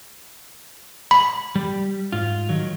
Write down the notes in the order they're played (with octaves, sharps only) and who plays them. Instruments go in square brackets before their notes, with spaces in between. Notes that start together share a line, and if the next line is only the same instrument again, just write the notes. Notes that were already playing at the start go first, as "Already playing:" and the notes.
[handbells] B5
[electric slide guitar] G3
G#2 F4
D#3 F#3